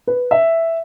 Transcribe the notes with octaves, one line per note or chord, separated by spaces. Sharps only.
B4
E5